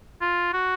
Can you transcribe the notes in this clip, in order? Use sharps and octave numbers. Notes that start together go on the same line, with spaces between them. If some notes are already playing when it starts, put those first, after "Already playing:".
F4
F#4